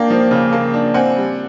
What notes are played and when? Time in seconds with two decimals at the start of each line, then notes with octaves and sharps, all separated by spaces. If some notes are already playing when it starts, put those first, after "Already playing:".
Already playing: A#3 D4 F5 G5
0.10 F3
0.31 C#3
0.53 A#3
0.74 D4
0.94 C4 F#5 G#5
1.16 G3